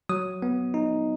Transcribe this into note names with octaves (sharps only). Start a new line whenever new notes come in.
F#3 D#6
B3
D#4